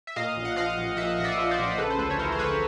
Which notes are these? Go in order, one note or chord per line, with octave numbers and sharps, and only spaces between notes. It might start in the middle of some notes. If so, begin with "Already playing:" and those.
E5
A#2 D#5 F5
A#1
F#5
F3 D#5 F5
A#1
A#2 E5 F#5
A#1 D#5
D5 E5
F3
C5 D5
A#1
C#3 A4 B4
C5
D2 A4 B4
C#5
E3 A#4 C5
C5
D2 B4 C#5